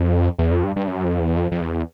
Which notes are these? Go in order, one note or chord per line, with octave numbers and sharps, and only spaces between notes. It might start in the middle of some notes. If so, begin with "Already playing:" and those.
Already playing: F2
E2
F2
G2
G2
F#2
F2
E2
F2
F2
E2